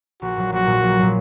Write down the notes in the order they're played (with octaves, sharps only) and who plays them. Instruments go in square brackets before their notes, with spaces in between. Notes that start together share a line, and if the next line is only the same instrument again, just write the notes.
[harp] A#1 [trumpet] F#4
[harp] A#2 F#3
[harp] A#1 [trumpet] F#4
[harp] A#2 F#3
A#1
A#2 F#3